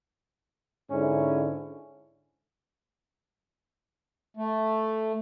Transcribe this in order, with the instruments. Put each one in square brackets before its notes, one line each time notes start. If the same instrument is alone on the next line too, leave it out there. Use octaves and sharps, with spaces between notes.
[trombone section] G#2 D3 C#4 E4
[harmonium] A3